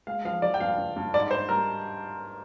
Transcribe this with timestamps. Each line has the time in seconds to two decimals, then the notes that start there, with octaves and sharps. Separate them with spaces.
0.07 G#3 F5
0.25 F3 F5
0.42 F3 D5
0.54 G5
0.60 G2 F5
0.78 G2
0.96 G2
1.13 G#2 D5
1.31 G#2 C5
1.49 G3 A#4